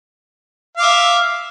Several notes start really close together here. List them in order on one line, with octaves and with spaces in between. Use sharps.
F5 D6 E5